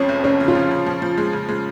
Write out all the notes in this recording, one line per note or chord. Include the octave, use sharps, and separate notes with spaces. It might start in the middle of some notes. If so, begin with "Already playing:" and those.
Already playing: F2 F3 G#3 C#4
F1
F1 C#4
C#3
F4
F3
C#3
F3
F3
G#3
C#3
G#3